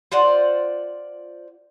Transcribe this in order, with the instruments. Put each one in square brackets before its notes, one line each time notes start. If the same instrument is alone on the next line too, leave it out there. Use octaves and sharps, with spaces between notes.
[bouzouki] F4 C5 D5 F#5